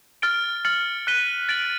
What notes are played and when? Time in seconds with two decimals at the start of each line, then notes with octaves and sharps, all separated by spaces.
0.22 F6 A6 D7 G7
0.65 F6 A6 C#7 F#7
1.07 F#6 B6 D#7 G7
1.49 A6 D7 F#7